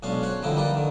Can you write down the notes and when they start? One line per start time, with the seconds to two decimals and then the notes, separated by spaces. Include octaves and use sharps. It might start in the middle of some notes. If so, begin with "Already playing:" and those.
0.03 B1 G#3 C#4 D4 F5
0.23 F#4 C5 C#5 F#5
0.43 D3 F3 G3 D#4 E4 G4
0.56 G3 A#3 D#4 B4 D5
0.74 D3 D#3